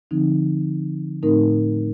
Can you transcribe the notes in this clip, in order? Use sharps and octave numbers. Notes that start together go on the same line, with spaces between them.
D3 F3 C4 D#4
A2 A3 C4 D#4 A#4